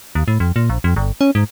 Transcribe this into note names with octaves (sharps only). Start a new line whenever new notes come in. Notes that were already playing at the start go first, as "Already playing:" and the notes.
D#2
A2
F2
A#2
A#1
F2
G1
C#4
G#2